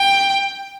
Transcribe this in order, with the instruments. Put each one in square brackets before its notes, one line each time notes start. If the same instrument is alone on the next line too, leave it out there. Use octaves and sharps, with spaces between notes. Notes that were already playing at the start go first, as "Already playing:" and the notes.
Already playing: [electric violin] G5